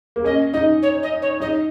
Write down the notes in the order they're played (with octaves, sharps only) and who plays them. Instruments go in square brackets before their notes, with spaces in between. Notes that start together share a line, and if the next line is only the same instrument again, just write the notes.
[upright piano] A#3
[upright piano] C#4 [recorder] D#5
[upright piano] D#4 [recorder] D#5
[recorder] C#5
D#5
C#5
[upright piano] D#4 [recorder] D#5